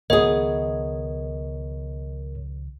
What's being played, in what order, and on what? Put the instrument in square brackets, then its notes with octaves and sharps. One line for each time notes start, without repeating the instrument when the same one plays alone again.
[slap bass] C#2 D#3 F3 [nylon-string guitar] B3 G#4 [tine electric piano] A#4 C#5 [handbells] D#5